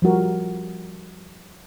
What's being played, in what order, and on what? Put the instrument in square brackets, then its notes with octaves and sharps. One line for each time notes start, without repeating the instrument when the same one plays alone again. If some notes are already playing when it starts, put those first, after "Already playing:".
[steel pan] F3 G3 F#4 A#4